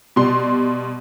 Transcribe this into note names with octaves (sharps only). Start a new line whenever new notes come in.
B2 G3 C6